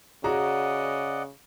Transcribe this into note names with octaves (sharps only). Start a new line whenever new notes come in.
C#3 F#4 G#4 D5 D#5 F#5 A#5